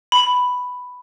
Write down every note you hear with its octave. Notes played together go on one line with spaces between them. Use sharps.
B5